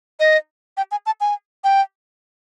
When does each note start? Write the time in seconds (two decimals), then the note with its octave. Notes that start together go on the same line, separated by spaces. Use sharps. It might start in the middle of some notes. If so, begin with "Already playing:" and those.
0.20 D#5
0.77 G5
0.91 G#5
1.06 A5
1.21 G#5
1.64 G5